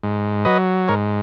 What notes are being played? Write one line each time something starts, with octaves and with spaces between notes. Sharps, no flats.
G#2
F#3 B4 D#5
G#2 A#4 C#5